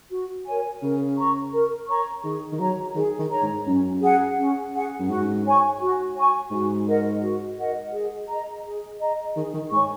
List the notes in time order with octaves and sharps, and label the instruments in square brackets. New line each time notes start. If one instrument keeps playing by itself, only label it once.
[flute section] F#4
A#4 C#5 G#5
[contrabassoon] C#3 [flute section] A#4
[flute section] C#5 A#5 C#6
A#4
C#5 A#5 C#6
[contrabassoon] D#3 [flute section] G#4
[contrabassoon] D#3
[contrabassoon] F#3 [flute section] C#5 A#5
[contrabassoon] D#3 [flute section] G#4
[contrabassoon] D#3
[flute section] C#5 A#5
[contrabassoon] G#2
[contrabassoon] F#2 [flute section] C#4
[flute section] G#4 F#5
C#4
G#4 F#5
[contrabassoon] F#2
[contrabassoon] G#2 [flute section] F#4
[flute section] C#5 G#5 C#6
F#4
C#5 G#5 C#6
[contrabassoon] G#2 [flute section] F#4
[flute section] A#4 D#5 F#5
F#4
A#4 D#5 F#5
G#4
D#5 A#5
G#4
D#5 A#5
[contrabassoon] D#3 [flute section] G#4
[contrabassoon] D#3
[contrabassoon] G#2 [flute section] C#5 G#5 C#6